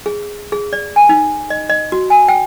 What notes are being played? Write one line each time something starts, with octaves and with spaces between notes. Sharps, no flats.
G#4
G#4
D5
G#5
D#4
D#5
D#5
F#4
G#5
G5